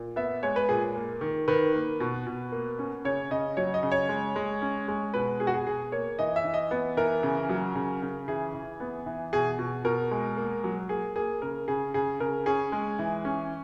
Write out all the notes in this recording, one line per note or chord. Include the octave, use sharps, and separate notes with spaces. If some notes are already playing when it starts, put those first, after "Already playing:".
Already playing: A#2
B3 E5
G#3 C#5
B4
A#2 G#4
A#3
D#3
D#3 B4
A#3
B2
B2
A#3
C#4
C#3 C#5
C#3 D#5
F#3 C#5
D#5
C#3
C#5
G#3
G#3
C#4
G#3
B2 B4
B2 G#4
F#4
G#4
B2 G#4
A#3 C#5
E3 D#5
E5
E3
D#5
B3
E3 A#4
C#3
F#3
C#3
C#3
E3 G#4
E3
B3
E3
B2 G#4
B2
B2 A#4
G#3
A#3
F#3
A#3 G#4
A#3 G#4
C#3 A#4
C#3 G#4
C#3 G#4
C#3 A#4
C#4 G#4
G#3
E3
C#4